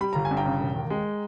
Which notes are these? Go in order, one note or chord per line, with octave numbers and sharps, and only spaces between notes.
G3 B5
G1 A#5
G#5
G2
G5 A#5
C#3
E1
D#2
G#3